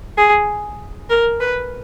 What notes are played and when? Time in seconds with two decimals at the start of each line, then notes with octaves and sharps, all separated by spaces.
0.17 G#4
1.10 A#4
1.40 B4